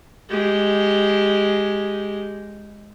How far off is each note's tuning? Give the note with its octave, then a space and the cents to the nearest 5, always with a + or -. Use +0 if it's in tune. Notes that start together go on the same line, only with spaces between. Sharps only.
G#3 +0 G4 -10